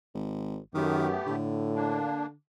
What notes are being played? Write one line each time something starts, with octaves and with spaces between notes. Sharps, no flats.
G#1
F#2 D#3 A3 B3 G4
A2 D3
A#3 D4